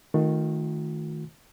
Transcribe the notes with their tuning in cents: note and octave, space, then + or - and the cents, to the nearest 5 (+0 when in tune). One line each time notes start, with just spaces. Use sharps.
D#3 +10 A3 +0 F4 +45